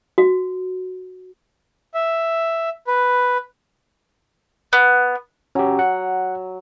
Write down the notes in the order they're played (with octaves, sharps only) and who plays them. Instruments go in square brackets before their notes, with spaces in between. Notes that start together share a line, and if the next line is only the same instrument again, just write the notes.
[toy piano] F#4
[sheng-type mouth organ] E5
B4
[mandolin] B3
[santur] F#3 [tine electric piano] C#4 G4
[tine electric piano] F#5